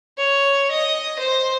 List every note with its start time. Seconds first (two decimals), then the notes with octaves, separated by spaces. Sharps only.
0.18 C#5
0.71 D#5
1.19 C5